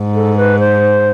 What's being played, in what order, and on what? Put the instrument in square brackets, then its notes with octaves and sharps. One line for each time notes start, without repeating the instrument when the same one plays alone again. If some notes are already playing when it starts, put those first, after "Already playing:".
Already playing: [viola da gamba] G#2
[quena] A4
B4
C5